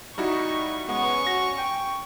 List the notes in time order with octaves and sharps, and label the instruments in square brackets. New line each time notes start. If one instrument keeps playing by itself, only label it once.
[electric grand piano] G3 E4 F#4 [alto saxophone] D#4 [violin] C#6
[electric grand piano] G#3 [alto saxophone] B3 [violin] C#4 C#6
[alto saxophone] F#4 [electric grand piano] A#6
[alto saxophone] G5 [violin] C#6